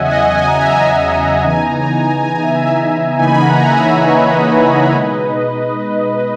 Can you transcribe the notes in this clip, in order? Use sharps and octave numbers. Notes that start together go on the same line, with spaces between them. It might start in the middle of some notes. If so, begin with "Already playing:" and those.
Already playing: E2 C#3 F#3 C#4 D#5 E5 F#5 G#5
D#5 F#5
G#5
A#5
E5 G#5
C#3 E3 B3 D#4 G#5
A#5
G#5
A#5
G#5
A#5
G#5
A#5
G#5
A#5
E5 G#5
C#3 E3 A#3 D#4 G#5 B5
F#5 A#5
F#5
E5 G#5
C#5 E5
B4 D#5
B2 G#3 D#4